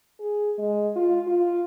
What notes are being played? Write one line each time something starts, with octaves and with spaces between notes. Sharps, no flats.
G#4
G#3
F4
F4